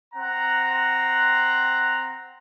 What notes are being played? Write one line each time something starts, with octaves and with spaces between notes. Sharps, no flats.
C4 F#5 A#5